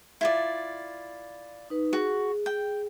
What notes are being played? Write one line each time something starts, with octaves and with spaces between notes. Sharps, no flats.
E4 F4 D5
D#4 B4
F#4 G#4
G5